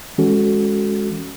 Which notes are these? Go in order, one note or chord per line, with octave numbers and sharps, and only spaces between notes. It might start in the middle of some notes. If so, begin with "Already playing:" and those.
E3 G#3 C#4 F#4 A4